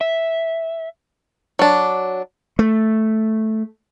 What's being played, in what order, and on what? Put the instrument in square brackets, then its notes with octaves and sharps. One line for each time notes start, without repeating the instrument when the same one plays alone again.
[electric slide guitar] E5
[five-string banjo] F#3 D4
[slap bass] A3